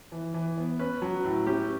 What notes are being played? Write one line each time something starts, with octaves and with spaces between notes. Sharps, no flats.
E3
E3
B3
C#4 B4
F#3
A2
C#4 G4